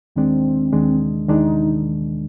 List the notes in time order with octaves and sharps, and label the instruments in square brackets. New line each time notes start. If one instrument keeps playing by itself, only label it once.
[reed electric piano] D#2 D#3 G#3 D4 [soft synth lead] C4
[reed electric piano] D#2 D#3 G#3 D4
[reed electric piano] D#2 D#3 G#3 D4 [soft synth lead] D#4